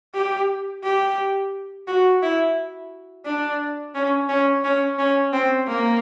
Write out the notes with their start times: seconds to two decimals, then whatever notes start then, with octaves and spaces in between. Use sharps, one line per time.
0.14 G4
0.83 G4
1.87 F#4
2.22 E4
3.25 D4
3.95 C#4
4.29 C#4
4.64 C#4
4.98 C#4
5.33 C4
5.67 A#3